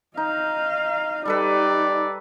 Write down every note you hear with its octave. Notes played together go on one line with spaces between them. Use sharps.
D#4 D#5 F5
G3 D#4 G4 A4 B4 D5